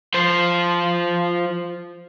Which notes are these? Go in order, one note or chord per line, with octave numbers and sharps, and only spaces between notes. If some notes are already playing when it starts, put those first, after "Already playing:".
F3 C5